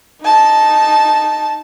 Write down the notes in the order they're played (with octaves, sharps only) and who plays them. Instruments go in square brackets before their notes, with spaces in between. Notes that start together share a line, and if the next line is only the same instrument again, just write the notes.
[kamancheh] D#4 A5